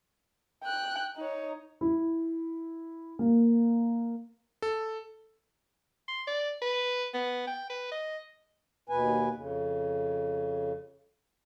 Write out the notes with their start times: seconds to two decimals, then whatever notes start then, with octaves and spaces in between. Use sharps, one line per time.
0.64 G5 F#6
1.17 D#4 C#5
1.81 E4
3.19 A#3
4.62 A4
6.08 C6
6.27 D5
6.61 B4
7.14 B3
7.47 G5
7.70 B4
7.91 D#5
8.89 D#2 B2 B4 G#5
9.36 F2 C#3